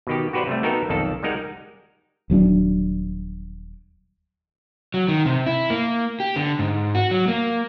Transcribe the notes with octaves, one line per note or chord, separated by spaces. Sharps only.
B2 D#3 G4
F#4 G4 B4 C5 D5
C3 G3 A3
B3 D#4 F#4 A4 A#4 G5
B1 F2 D#3 A4 A5
G3 G#3 D#4 A#4 F#5
D#1 F#3 C4 D4
F#3
D#3
C3
E4
A#3
G4
D3
G#2
F#4
F#3
A#3